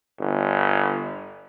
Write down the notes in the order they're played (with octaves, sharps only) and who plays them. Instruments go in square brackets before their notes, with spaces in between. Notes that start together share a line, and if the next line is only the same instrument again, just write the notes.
[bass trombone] G1